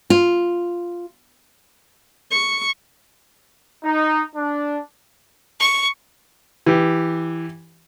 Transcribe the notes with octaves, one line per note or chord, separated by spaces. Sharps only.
F4
C#6
D#4
D4
C#6
E3 G4